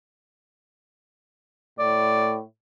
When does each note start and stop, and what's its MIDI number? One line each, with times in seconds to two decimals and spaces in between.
1.79 2.42 45
1.79 2.35 74